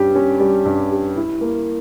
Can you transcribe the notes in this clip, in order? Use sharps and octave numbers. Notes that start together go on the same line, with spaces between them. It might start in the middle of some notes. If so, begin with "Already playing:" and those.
Already playing: G2 G3 C#4 G4
C#4
G3
G2
G4
E4
A#3